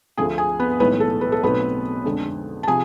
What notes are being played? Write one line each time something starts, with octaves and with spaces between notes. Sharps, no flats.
D2 D3 F3 A3 G#4 G#5
G#4 G#5
B3 B4
B1 A2 E3 G#3 B3 B4
A4
B4
A4
B1 B2 A3 B3 C4 B4
F2 D3 G#3 D4
A5
C3 F3 G#4 G#5